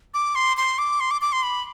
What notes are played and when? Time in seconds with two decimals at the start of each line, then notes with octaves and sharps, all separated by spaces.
0.14 D6
0.35 C6
0.57 C6
0.78 D6
1.00 C6
1.11 D6
1.22 D6
1.32 C6
1.43 B5